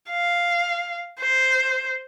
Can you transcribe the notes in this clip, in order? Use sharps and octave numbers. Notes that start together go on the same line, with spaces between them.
F5
C5